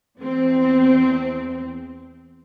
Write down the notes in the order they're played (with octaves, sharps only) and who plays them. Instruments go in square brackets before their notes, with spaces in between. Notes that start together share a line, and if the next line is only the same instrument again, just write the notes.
[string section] E2 C4